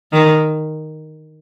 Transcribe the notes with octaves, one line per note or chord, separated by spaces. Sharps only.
D#3